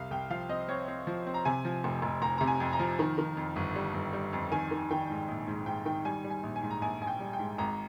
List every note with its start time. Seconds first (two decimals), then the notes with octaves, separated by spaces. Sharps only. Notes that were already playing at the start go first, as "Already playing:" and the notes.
Already playing: C2 F5
0.11 C2 G5
0.30 F3 F5
0.49 C4 D#5
0.68 C4 C#5
0.88 C4
1.07 F3
1.26 C4
1.34 A#5
1.45 C3 G#5
1.65 F3
1.84 F1
2.02 F1
2.22 F1 A#5
2.38 C3 A#5
2.47 G#5
2.60 F2
2.73 A#5
2.79 F3
2.99 D#3
3.18 D#3
3.37 F2
3.56 G1
3.76 G3
3.94 G1
4.13 G3
4.33 F2
4.52 D#3 G#5
4.71 D#3
4.91 D#3 G5
5.10 G#2
5.28 A#1
5.47 G#2
5.66 G#2 G5
5.85 D#3 G5
6.05 G3 G#5
6.24 G3
6.30 G#5
6.43 A#1
6.56 G#5
6.63 G#2
6.70 A#5
6.82 A#1 G#5
7.01 A#1 G#5
7.07 G5
7.20 G3
7.33 G5
7.39 G#2
7.58 G#1 A#5